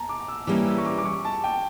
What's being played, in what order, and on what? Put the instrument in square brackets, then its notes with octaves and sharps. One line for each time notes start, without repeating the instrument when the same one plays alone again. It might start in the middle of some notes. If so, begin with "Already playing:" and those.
Already playing: [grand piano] A5 A#5
D6
E6
[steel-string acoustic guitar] E3 G3 A#3 C#4 G4 [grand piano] D6
[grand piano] E6
C#6
D6
D6
C#6
A5
G5